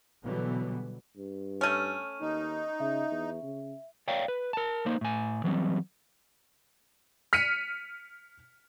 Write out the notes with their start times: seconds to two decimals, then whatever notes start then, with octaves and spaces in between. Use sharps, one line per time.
0.24 B2 D3 E3 F#3 G3 B3
1.17 G2
1.61 A3 C#4 F6 D#7
2.21 D#2 D#4
2.80 C#3 E5
3.11 E2
3.43 C#3
4.08 C#5 D5 F5 G5
4.28 B4
4.53 A#4 A5
4.86 A#3 D#4 C5
5.01 A2 G#5
5.44 E3 F#3 G3 A3 C4
7.33 F6 B6 C#7 D#7